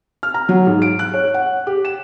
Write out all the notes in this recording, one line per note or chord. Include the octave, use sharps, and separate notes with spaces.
F6
A#5
F#3
G#2
D7
F#6
C#5
F#5
G4
E7